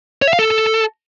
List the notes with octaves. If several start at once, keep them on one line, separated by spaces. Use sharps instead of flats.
C#5
E5
F5
A4